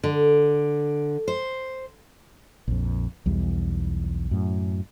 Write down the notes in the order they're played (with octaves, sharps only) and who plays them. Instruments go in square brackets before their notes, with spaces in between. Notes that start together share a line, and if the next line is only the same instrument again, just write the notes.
[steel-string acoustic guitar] D3
C5
[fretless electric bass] A#1 F2
B1 E2 G3
F#2 A2